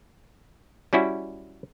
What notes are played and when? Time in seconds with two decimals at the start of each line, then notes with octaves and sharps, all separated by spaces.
0.93 G3 C#4 E4 F#4